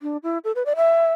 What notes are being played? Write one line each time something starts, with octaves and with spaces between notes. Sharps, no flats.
D4
E4
A4
B4
D5
E5